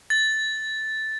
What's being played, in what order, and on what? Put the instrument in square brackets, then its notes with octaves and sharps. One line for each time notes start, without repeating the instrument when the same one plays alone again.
[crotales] A6